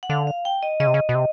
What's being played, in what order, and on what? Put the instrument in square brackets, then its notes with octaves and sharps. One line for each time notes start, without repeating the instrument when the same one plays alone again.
[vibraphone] F#5
[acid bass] D3 [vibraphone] F5
[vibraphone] F5
G5
D#5
[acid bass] C#3 [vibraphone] D#5
[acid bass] C3
C#3
B2
C3